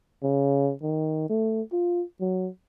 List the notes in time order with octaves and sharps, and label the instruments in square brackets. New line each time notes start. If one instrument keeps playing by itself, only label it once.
[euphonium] C#3
D#3
A3
F4
F#3